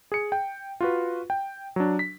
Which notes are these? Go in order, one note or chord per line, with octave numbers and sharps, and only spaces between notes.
G#4 C#7
G5
F4 F#4 B4
G5
F#3 D4
B6